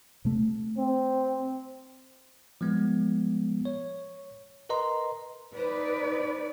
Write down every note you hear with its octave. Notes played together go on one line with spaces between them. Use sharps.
C3 A3
C4
F3 G#3 B3
C#5
A#4 B4 D#5 A#5 C6
D#4 B4 C5 D5